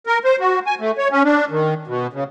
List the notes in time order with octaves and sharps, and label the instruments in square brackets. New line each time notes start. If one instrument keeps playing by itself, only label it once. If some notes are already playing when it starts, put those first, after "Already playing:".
[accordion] A#4
C5
F#4
G#5
A3
C#5
C#4
D4
D#3
B2
C#3